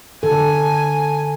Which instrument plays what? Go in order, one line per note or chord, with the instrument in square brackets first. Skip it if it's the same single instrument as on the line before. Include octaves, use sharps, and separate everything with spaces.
[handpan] D3 A4 [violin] G#5